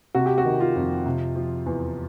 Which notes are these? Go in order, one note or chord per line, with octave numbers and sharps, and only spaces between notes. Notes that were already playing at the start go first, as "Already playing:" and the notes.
C3 F#4
G4
F#4
D#3
F4
F2
C3
F3
E2